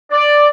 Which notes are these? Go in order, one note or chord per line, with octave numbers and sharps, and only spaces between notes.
D5